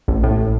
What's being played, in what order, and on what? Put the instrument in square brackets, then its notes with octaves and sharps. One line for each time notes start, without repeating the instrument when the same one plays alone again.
[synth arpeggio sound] A1
A2